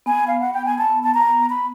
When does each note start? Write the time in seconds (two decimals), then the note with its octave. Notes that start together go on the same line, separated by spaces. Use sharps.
0.06 B3 G#5
0.28 F5
0.40 F#5
0.53 G5
0.66 G#5
0.78 B3 A5
1.03 A5
1.14 A#5
1.50 B5